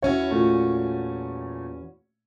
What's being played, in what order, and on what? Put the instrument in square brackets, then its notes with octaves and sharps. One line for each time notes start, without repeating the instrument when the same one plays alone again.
[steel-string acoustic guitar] E2 C#4 F#4 [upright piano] E4 C#5
[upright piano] A#2 A3